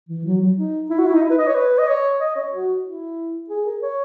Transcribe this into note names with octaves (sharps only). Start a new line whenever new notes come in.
E3
F#3
F#3
D#4
E4
F#4
E4
D#4
E4
B4
D#5
C#5
B4
D#5
C#5
D#5
C#5
F#4
E4
G#4
A#4
C#5